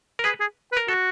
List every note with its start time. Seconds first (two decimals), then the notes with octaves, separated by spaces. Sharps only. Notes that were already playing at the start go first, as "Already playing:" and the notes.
0.19 A#4
0.24 G#4 B4
0.40 G#4
0.72 B4
0.77 A#4
0.88 F#4 A4